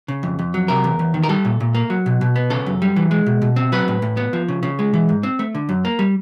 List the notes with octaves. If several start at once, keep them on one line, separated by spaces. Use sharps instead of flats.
C#3
F2
F2
F#3
C3 A#4
E2
E2
D#3
A#4
G3 A4
A#2
A#2
A#3
F#3
B2
B2
B3
C#3 A4
F#2
G3
E3
G#3
B2
B2
C4
F#3 B4
A2
A2
B3
F3
C#3
C#3
G#3
E3
G#2
C4
A3
D3
F#2
A#3
G3